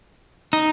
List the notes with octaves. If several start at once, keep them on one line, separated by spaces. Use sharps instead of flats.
D#4